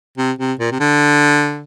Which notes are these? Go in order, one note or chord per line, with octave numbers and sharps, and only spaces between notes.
C3
C3
A#2
C3
D3